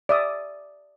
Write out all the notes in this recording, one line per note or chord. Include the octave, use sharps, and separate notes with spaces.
D5 E5 D#6